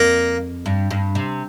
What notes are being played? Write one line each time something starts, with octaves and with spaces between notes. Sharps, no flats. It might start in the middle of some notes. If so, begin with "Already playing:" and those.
Already playing: F2 A#3 A#4
G2
G2
C3